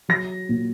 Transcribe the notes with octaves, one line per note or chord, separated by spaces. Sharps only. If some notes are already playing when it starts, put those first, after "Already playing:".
F#3 A#6
A#2